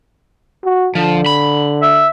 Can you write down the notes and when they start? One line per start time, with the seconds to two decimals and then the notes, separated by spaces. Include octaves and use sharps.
0.64 F#4
0.95 D3 F3
1.26 B5
1.82 E5